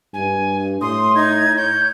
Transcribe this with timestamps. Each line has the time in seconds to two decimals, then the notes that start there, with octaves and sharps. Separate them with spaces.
0.14 G2 G#5
0.81 A2 C6 D#6
1.15 D#4 G#6
1.56 C#5 G6